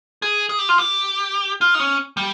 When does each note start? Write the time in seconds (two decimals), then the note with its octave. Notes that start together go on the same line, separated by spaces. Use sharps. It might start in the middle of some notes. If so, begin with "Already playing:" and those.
0.22 G#4
0.49 G#4
0.59 G4
0.69 F4
0.78 G4
1.61 F4
1.74 D#4
1.80 C#4
2.17 G3